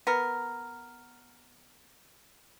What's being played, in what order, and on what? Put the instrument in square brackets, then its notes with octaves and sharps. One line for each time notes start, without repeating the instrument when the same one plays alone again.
[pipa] B3 A#4